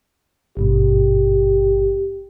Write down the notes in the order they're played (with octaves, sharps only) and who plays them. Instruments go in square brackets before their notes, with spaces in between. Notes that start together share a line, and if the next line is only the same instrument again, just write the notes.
[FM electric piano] G#1 G2 B2 [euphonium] G4